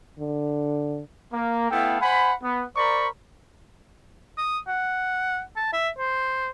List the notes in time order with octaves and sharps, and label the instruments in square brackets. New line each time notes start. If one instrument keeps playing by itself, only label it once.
[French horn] D3
[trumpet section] A#3
A3 B3 E4 A4 F5 G5
C5 F#5 G#5 B5
B3
A#4 C5 D5 A#5 B5 C#6
[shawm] D#6
F#5
A5
E5
C5